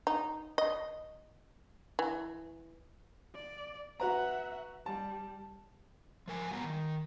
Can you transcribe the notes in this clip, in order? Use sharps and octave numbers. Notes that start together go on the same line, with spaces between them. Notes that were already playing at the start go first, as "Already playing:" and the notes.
D#4
D#5
E3
D5
F#4 B4 E5 F#5 A#5
G3 A5
F3 A#4 G#5
F#3 G3 B3 G#5 A#5
D#3